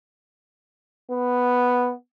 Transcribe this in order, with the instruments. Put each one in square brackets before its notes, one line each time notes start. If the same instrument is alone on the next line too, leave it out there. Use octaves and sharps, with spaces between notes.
[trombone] B3